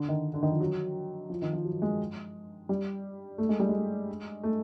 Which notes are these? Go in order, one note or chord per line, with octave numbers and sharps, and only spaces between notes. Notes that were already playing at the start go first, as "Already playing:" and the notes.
Already playing: D3
D#3
D3
D#3
F3
F#3
F3
D#3
F3
F#3
G#3
G3
A3
G#3
G3
G#3
A3